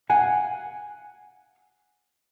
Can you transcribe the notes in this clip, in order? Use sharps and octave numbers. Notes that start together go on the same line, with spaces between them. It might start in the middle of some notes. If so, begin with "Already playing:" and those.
F5 F#5 G#5